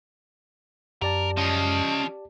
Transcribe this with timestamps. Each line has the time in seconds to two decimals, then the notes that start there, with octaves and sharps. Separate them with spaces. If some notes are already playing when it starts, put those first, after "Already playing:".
1.02 F#2 G4 A#4 D5 A5
1.37 F3 C#4 D#5